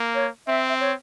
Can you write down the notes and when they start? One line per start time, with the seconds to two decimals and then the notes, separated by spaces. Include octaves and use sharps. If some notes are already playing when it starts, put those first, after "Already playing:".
Already playing: A#3
0.15 C#5
0.47 C4 E5
0.69 E5
0.80 C#5